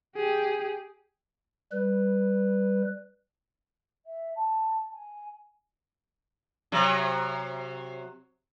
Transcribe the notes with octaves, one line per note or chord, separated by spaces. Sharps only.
G4 G#4
G3 B4
E5
A5
G#5
C3 F#3